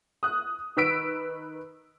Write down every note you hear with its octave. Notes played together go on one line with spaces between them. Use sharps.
D#6 F#6
D#3 B4 E6 B6 D7